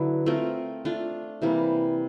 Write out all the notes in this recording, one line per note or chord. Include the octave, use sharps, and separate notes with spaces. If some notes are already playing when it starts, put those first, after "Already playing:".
Already playing: D3 F#3 B3 E4
A3 C4 F4 A#4
A3 D4 F4
C3 E3 G3 A#3